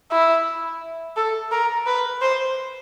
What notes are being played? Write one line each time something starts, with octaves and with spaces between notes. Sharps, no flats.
E4
A4
A#4
B4
C5